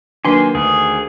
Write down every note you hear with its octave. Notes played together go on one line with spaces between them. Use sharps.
D#3 F#3 A#3 D4 B4 G#5 C6
D2 D#3 G#4